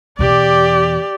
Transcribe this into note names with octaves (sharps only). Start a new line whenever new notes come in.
E2 B2 G4 D5